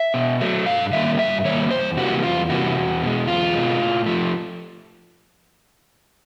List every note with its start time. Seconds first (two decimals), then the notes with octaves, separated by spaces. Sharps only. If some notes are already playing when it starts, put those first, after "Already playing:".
Already playing: E5
0.14 B2
0.41 F#3 A3
0.66 G2 F5
0.93 D#3 G3 A#3 E5
1.19 G2 E5
1.45 D#3 G3 A#3 C#5
1.71 E2 C5
1.97 C3 E3 G3 A#3 F#4
2.23 E2 F4
2.49 C3 E3 G3 A#3 F#4
2.76 E2
3.02 B2 G#3
3.27 E2 F4
3.53 B2 G#3
3.80 A2
4.06 F3 A3